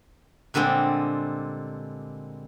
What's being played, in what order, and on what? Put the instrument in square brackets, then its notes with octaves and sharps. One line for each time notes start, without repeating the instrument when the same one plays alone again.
[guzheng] A#2 D3 G3 G#3 C4